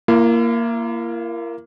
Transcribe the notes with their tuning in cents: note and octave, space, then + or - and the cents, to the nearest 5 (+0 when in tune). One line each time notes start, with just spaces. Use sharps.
A#3 +0 E4 +45